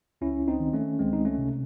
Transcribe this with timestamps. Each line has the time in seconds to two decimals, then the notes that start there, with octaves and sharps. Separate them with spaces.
0.21 C#2 C#4 E4
0.48 C4 D#4
0.60 D#3
0.73 A3 C#4
0.99 C#2 G#3 C4
1.13 D#4
1.25 A3 C#4
1.38 C3